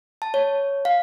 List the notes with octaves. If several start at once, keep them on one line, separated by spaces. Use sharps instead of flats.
A5
C#5
F5